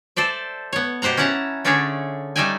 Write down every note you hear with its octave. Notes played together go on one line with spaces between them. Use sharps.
A4 C5 D5 E5
B3 C#5
B2 G4 C5 F#5 A#5
C#4 E4 B4 F#5 A5 A#5
D3 A3 C#4 D4 G#4 C#5
G3 A3 D#4 E5 G5 G#5